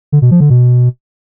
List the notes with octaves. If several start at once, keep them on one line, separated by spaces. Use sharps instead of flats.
D3
B2
F3
D3
B2